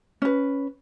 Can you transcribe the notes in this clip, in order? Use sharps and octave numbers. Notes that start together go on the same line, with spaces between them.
C#4 B4